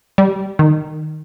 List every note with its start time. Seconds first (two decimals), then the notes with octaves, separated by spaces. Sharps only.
0.18 G3
0.59 D#3